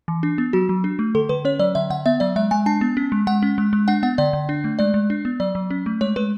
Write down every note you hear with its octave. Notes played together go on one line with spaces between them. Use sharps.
E3
D4
B3
F#3 F#4
F#3
D4
A3
D3 A4
D3 B4
C#4 C#5
F#3 D5
D3 E5
D3 F#5
B3 E5
F#3 D5
G#3 E5
G#3 G#5
D4 A5
B3
C#4
G#3
G#3 F#5
C#4
G#3
G#3
D4 F#5
B3 F#5
D3 D5
D3
D4
A3
G#3 D5
G#3
D4
B3
F#3 D5
F#3
C#4
A3
G#3 C#5
G#3 B4